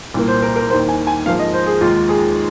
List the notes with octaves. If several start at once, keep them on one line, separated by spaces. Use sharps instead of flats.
C2 A#2 A#3
C5
A#4
A#4
D#2 D#3 A#3 C5
G#5
G#5
G#2 F3 A#3 F5
D#5
C5
G#4
D#2 D#3 G#3 F4
G#4